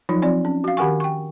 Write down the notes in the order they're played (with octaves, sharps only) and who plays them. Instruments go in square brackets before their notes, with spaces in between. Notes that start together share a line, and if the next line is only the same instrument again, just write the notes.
[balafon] F3 F#3 D#4 F4
F3 C4 F4 D5
C#4
F#4 F5
D#3 G4 A#4 F#5 G#5 C#6
G5 C#6